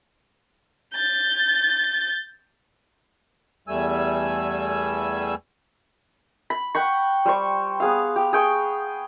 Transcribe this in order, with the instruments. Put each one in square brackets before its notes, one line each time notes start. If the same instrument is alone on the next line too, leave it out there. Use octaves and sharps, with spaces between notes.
[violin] G6 A6
[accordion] E2 G3 A3 G#5 E6
[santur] B5
F#5 G5 B5 C#6
G3 C5 C#6
B3 G#4 F5
G4
G#4 G5 C#6